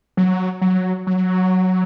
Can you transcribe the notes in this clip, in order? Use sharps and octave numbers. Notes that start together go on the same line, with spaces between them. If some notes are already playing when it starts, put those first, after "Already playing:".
F#3
F#3
F#3